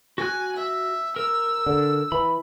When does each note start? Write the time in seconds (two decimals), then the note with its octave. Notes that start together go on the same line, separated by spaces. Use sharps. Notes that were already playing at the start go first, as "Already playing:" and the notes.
0.18 F#4 G#5 F#6
0.56 E5
1.16 A#4 E6
1.66 D3
2.12 E3 B5